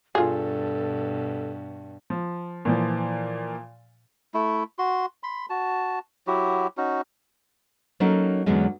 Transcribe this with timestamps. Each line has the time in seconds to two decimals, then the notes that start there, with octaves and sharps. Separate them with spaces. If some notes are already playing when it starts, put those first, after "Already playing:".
0.15 G2 B2 F4 G#4 A4
2.10 F3
2.65 A#2 E3 F3
4.34 A3 E4
4.79 F#4 C6
5.23 B5 C6
5.50 F#4 A5
6.27 F#3 E4 F#4 G4
6.77 C#4 D#4 F#4
8.00 F#3 A#3 C#4 D#4 A4 A#4
8.46 E2 D3 F#3 G#3 C#4